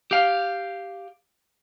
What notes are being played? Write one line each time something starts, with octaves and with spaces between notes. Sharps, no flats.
G4 F5